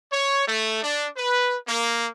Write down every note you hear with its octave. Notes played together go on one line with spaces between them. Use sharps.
C#5
A3
D4
B4
A#3